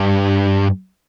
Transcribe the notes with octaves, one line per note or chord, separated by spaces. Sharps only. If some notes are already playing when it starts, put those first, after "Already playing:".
Already playing: G2